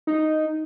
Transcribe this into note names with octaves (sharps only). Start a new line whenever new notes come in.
D#4